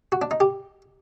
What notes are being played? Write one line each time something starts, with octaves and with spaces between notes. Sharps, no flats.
F#4
D4
D#4
G4